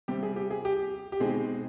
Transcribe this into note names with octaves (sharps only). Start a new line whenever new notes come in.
C3 G3 C4 G4
G#4
G4
G#4
G4
G4
B2 G#3 C4 D#4 G#4